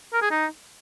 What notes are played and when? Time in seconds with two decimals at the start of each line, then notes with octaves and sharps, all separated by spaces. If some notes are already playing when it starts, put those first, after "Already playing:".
0.13 A#4
0.22 G#4
0.31 D#4